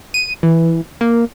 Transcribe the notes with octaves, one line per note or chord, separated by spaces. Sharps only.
D#7
E3
A#3